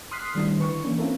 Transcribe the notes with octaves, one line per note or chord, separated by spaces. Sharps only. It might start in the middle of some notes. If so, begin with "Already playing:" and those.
C6 D#6 F6 F#6 B6 C7
D#3 G3 A3 D4 E4
D3 B4 C#6
E3 A#3 C#4 D4
C4 C#4 E4 F4 A4 A#4